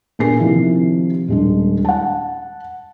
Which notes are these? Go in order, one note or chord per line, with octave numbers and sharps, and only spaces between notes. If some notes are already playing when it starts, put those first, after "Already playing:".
A#2 B3 D4 G#4 G#5 C7
C3 D#3 F3 E4
D#1 G#3 D4
F#5 A5